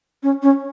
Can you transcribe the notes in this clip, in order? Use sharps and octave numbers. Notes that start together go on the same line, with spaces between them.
C#4
C#4